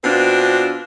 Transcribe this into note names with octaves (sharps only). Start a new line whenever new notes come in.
B2 C4 D4 F4